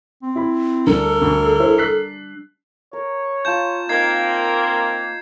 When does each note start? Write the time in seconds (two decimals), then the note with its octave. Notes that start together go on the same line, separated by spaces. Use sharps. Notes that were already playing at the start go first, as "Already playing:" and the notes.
0.22 C4
0.36 E4 B5
0.87 D2 G3 D4 A4 A#4
1.22 D2
1.60 E4 C5
1.78 F#6 B6 C7
2.93 A#4 C#5
3.45 F4 A5 A#5 G6 E7
3.89 A#3 C4 D#4 G#6 C7